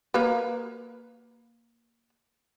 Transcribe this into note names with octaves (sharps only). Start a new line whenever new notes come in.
A#3 A#4 B4